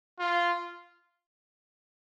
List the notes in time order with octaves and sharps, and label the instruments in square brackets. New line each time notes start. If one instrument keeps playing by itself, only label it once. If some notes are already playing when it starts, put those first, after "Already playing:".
[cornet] F4